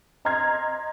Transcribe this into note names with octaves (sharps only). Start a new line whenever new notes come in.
D#5 A#5 C6 F6 G#6 C7